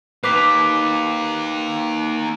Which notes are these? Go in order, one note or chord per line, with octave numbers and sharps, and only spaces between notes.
A#3 D#4 B4 D6 B6